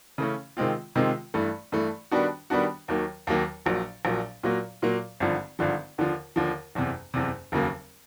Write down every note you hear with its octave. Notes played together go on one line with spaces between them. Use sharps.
C#3 E3 A3 C#4
C3 D#3 G#3 C4 F4
C3 D#3 G#3 C4 F4
G2 E3 A3
G2 E3 A3
D#3 G3 B3 D4 F#4
D#3 G3 B3 D4 F#4
D#2 D#3 F#3 A#3
D#2 D#3 F#3 A#3
A#1 A#2 F#3
A#1 A#2 F#3
A#2 F#3 A#3
A#2 F#3 A#3
G#1 G2 D3 F3
G#1 G2 D3 F3
D#2 D3 F3
D#2 D3 F3
F#1 E2 C3
F#1 E2 C3
F1 D#2 C#3 F#3 A#3